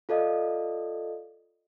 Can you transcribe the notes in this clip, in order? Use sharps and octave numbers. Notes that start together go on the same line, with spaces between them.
F4 A4 D5 D#5 F5